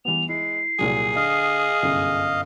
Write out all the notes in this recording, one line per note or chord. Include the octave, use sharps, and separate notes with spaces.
E3 G3 B3 F7
G#3 E4 C7
C2 A#2 F#3 G#4
D3 D#5 F5
G1 C2 F#2